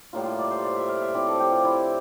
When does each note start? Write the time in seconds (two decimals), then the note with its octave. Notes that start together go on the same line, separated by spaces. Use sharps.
0.13 A2 G3 A#3 F4
0.26 F4
0.39 D5
0.51 C5
0.64 D5
0.76 E5
0.89 F5
1.02 E5
1.14 F3 C4 E4 D5
1.27 A4
1.40 G4
1.52 F4
1.64 E4